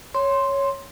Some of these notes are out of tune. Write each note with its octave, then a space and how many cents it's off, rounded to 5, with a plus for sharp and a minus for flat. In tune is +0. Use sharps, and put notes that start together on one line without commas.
C#5 +0 C6 +0